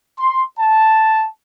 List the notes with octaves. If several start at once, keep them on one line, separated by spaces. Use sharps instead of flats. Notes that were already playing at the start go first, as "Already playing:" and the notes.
C6
A5